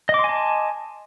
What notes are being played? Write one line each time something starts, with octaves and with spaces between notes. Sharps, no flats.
D#5 G#5 A5 C6 D6